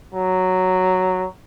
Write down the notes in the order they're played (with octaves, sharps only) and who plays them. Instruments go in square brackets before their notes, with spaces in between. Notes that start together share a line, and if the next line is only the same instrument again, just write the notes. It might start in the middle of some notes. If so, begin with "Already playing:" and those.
[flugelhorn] F#3